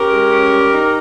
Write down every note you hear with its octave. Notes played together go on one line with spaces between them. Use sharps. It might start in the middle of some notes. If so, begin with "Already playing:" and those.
Already playing: C#4 G4 A#4
G#3
C#4
G3
D#4